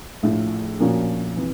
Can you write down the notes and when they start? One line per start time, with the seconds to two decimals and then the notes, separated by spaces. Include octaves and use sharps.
0.23 A#1 A2 F3 A3
0.80 A#2 F3 A#3 C#4 F#4
1.37 C3 E3